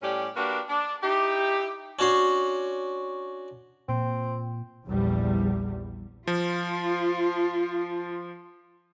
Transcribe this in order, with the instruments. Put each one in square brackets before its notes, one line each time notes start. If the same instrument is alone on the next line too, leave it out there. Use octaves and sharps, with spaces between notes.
[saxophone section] A2 G3 C#4 G4 D5
A#3 D4 F#4 G4 B4
D4
D#4 E4 G4
[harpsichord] C#4 D4 F#4 C#5 C6
[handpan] A#2 [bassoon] C4
[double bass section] A#1 E2 G3
[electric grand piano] F3 [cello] F4